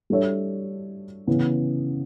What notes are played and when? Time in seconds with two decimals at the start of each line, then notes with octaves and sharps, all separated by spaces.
0.10 G3 D4 A4 C#5 E5
1.27 C#3 E3 B3